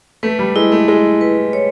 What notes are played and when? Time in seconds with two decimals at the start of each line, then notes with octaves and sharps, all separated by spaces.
0.23 A3 B4
0.39 G3
0.56 G#3 E4
0.72 A3
0.88 G#3 E4
1.21 B4
1.53 C#5